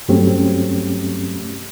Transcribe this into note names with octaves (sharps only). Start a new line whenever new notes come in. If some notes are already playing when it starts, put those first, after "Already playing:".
G2 F#3 A3 C4 C#4 G4